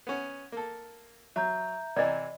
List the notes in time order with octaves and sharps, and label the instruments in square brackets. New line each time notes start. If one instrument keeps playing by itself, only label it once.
[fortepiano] B3 C#4
A#3 A4
[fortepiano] F#3 [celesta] E5 A#5 G6
[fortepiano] C3 E3 [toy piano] D5 D#5